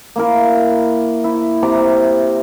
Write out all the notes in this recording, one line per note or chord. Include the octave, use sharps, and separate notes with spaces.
A#3 E4 A#4
E4
C3 A#5 D6